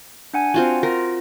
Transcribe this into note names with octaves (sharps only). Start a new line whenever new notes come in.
D4 F#5 G#5
C4 F4 F#4
F4 A#4